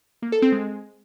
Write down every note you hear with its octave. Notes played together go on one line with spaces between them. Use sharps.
A#3
A4
C4
G#3